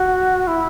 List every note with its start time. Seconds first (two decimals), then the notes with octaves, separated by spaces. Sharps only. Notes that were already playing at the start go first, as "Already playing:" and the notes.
Already playing: F#4
0.47 E4